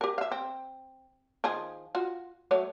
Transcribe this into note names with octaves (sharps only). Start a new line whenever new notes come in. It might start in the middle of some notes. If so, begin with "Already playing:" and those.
G4 A#4
E5 F5
C4
D#3 F3 G#4
F4 F#4
F#3 A3 C#5